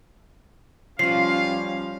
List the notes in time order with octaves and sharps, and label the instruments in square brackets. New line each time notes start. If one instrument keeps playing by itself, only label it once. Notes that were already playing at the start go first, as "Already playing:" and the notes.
[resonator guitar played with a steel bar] F3 F4 [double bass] G3 C#4 [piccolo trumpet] F5 [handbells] C7